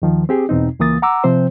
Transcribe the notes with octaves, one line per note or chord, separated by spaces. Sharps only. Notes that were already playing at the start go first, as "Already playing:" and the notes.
D#2 D#3 F3
C4 G4 G#4
E2 B2 C4 D#4
C#2 E3 A#3 D#6 A6
F#5 A#5 D6 E6
C3 F3 C4 C5